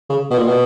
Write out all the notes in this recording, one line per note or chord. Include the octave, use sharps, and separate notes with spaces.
C#3
B2
A#2
B2